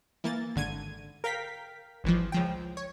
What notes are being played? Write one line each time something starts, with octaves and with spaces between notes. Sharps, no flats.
E3 A#3 A6
G#1 D3 G#6 D#7
A#4 F5 G5 B6
G#1 E3 F3
C#2 F3 G5
C#5